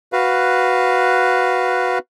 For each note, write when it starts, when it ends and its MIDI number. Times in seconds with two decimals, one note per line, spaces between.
0.13 1.98 66
0.13 1.98 71
0.13 1.98 77